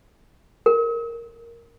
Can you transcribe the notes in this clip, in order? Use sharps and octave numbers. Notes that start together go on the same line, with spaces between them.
A#4